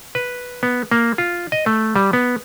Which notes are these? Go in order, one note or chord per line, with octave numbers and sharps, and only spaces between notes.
B4
B3
A#3
F4
D#5
A3
G3
B3